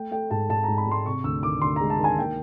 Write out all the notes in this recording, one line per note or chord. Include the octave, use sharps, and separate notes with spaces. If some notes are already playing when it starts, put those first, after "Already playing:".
Already playing: A3 G5
A3 G5
G#2 A5
G#2 A5
G#2 A#5
B5
G#2 C6
C3 C#6
D2 E6
D#3 D6
D2 C6
G#3 A#5
A5
D#3
G#5
A#3 G5